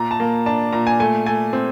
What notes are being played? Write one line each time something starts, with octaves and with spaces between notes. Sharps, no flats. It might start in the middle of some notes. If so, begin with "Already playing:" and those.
Already playing: A#2 A#3 A#5
A5
A#3
D4 A5
A#2 A#5
G#5
A3 G#5
A3 G#5
C4